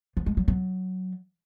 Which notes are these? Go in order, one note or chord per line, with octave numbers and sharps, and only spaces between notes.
F3
G#3
F#3
F#3